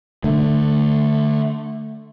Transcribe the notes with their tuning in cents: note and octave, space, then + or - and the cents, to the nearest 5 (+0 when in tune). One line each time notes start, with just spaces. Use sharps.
D3 +15 A3 +0